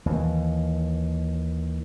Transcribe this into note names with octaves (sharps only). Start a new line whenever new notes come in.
D#2 E3